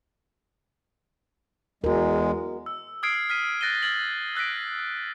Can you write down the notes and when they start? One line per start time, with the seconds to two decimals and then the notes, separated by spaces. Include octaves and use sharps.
1.84 E2 G#3 F#4 A#4
2.66 E6
3.03 D#6 F6 G#6 C7 D7
3.30 F6 B6 D#7
3.61 F#6 A6 A#6 D7 D#7 G7
3.83 F6 G#6 A6 F#7
4.35 E6 F#6 A#6 B6 D7